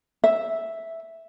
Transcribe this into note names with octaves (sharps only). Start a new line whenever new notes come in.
E5